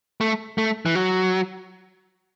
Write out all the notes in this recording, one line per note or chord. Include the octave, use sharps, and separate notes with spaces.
A3
A3
E3
F#3